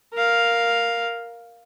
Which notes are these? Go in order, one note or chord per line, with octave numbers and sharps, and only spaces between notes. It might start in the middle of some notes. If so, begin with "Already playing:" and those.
A#4 F5